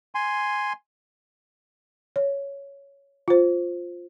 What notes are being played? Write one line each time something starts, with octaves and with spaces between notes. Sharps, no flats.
G#5 C6
C#5
F4 C5